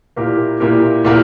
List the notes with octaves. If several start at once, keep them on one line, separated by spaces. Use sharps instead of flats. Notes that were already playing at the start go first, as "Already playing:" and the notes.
A#2 A#3 E4 G4 A#4
A#2 A#3 E4 G4 A#4
A#2 A#3 E4 G4 A#4